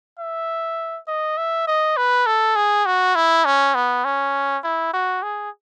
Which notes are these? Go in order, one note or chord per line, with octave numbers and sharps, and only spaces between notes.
E5
D#5
E5
D#5
B4
A4
G#4
F#4
E4
C#4
B3
C#4
E4
F#4
G#4